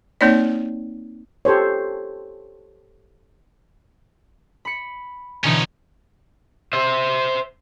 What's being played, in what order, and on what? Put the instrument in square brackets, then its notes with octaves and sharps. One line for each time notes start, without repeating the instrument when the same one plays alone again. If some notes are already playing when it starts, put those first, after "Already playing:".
[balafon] A#3 C4 D#4 C#5 D5
[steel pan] G4 A4 C5 C#5
[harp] B5 C#7
[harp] B2 D3 E3 [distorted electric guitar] C#4 D#4
[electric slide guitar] C5 E5